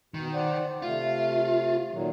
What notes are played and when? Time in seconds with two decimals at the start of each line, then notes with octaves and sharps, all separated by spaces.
0.14 B2 D#3
0.34 C5 D5 F#5
0.82 C3 A3 F4 F5
1.92 A#2 D#3 F#3